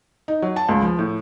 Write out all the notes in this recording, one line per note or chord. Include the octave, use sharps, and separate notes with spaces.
D#4
F#3
A5
C#2
F3
A2